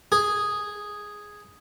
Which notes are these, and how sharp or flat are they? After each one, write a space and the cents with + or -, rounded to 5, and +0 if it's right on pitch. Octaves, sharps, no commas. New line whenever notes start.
G#4 -5